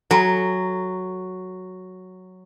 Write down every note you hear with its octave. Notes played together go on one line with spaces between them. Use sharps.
F#3 A4 G#5 A#5